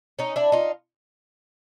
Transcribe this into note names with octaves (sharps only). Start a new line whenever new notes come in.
C#4 D#4
D4 E4
D#4 F4